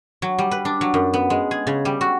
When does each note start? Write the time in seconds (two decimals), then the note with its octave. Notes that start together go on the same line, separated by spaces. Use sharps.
0.22 F#3
0.38 G3
0.51 B4
0.65 D4
0.81 F#3
0.94 F#2
1.13 B3
1.30 G#3
1.51 G#4
1.67 C#3
1.85 G3
2.01 F#4